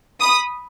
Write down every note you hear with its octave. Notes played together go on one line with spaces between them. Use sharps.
B5 D#6